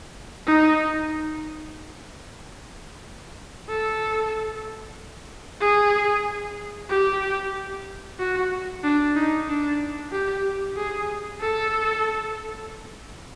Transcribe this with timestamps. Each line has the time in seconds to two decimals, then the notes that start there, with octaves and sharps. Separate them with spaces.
0.47 D#4
3.69 A4
5.61 G#4
6.90 G4
8.19 F#4
8.84 D4
9.16 D#4
9.48 D4
10.12 G4
10.76 G#4
11.40 A4